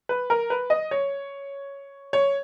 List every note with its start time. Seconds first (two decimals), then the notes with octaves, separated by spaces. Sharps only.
0.09 B4
0.30 A#4
0.50 B4
0.70 D#5
0.91 C#5
2.13 C#5